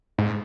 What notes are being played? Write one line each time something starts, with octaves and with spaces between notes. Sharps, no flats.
G#2